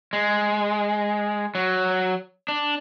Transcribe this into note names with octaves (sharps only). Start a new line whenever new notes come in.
G#3
F#3
D4